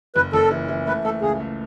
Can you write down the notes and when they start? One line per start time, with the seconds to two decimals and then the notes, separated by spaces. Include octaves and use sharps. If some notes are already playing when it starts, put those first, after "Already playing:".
0.16 F#1 B4
0.33 F#1 A4
0.51 E3
0.69 E3
0.87 A3 B4
1.05 A3 A4
1.22 C#2 G#4
1.40 A3